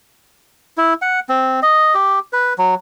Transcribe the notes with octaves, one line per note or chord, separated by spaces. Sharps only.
E4
F#5
C4
D#5
G4
B4
F#3